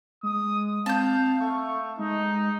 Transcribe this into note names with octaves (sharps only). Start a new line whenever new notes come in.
G#3 D#6
C4 F5 A5 G6
A3 C#6
G#3 D#4